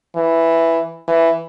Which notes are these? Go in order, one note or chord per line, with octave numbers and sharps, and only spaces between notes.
E3
E3